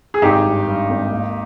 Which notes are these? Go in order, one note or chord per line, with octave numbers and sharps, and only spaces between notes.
G#4
G#1 D#4 G4
G2
G2
G#1
D#2